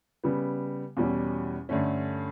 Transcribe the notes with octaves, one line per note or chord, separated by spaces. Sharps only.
C#3 G3 B3
E2 B2 G3 C#4
G2 D3 A3 C#4